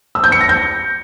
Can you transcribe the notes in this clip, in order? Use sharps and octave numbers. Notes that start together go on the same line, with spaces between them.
E6
G6
C#7
A#6
G6